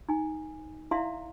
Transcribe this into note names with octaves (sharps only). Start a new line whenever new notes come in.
D#4 G#5
E4 D5 E5 F5 A#5 C6